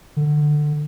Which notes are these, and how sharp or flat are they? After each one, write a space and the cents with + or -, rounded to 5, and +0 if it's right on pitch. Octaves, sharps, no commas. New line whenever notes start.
D3 +20